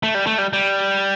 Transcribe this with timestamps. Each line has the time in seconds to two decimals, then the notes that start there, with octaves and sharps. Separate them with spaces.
0.03 A3
0.14 G3
0.26 A3
0.38 G3
0.53 G3